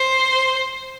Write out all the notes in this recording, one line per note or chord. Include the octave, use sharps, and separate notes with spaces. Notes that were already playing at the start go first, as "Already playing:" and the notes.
Already playing: C5